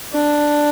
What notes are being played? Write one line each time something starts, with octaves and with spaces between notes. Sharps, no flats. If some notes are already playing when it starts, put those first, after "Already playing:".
D4